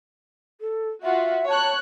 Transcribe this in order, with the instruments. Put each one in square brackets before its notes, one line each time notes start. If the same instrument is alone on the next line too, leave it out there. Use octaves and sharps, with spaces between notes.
[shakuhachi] A4
[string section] F4 F#4 [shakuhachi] E5
[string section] C#5 F#6 [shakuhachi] A5